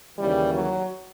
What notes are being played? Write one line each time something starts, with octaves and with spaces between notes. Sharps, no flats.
D#2 C#3 E3 G3
F#3